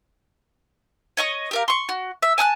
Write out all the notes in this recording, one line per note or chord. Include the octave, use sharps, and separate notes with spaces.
C#5 D#5 C#6 D#6
G4 A#4 F5
C6 C#6
F#4
E5
G#5 A5 D#6 F#6